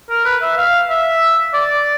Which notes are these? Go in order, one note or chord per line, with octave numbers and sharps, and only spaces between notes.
A#4
B4
E5
F5
E5
D5